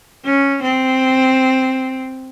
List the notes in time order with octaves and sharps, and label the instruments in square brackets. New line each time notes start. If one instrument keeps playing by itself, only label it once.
[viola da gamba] C#4
C4